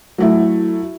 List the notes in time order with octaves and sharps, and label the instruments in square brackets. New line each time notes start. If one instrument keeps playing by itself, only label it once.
[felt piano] F#3 A3 E4